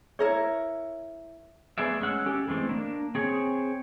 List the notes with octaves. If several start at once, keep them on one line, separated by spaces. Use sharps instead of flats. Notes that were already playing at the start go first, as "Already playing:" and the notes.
E4 A#4 C#5
A3 B3 G#4 D5 E5
G#3 C#4 F#5 E6
C#4 G4 A4
E3 G#3 A3 C4
A#3 D4
C4 G#4 C#5